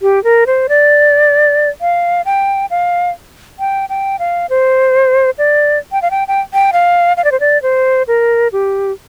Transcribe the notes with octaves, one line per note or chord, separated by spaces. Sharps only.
G4
A#4
C5
D5
F5
G5
F5
G5
G5
F5
C5
D5
G5
F5
G5
G5
G5
F5
F5
D5
C5
D5
C5
A#4
G4